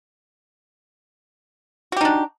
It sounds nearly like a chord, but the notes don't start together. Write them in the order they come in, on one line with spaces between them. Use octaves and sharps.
F#4 G4 D#4 D4